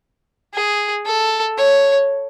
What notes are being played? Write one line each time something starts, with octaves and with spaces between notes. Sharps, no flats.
G#4
A4
C#5